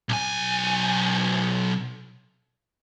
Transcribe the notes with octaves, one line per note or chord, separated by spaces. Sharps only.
B1 G#5